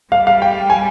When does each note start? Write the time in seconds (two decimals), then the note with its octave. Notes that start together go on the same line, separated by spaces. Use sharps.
0.12 G3 F5
0.27 F5
0.42 G5
0.70 G#5